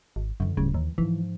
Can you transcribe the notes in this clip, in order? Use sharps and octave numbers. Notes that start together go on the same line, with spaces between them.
G#1
F#2 D3 E3
D1 G2 C#3
D#2 E3
G#2 E3 F3